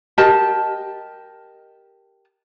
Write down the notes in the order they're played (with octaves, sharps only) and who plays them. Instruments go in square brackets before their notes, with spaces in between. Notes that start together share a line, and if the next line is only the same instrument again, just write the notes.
[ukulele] G4 A#4 D#5 A5